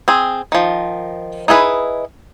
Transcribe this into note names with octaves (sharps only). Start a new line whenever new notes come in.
C4 G#4
D#3 F3
D#4 E4 G#4 B4